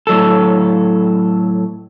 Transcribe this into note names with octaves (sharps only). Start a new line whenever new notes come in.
A2 F#3 A4